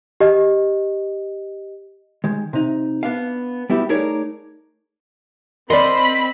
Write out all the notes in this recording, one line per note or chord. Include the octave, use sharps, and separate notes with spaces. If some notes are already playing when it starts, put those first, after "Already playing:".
G4 D#5
D#3 G#3
C3 D#4
B3 D4 F5
G3 B3 E4 F#4 G4
A3 D#4 G#4 A#4 C#5 D5
C4 A#4 D5 D#5 B5 C6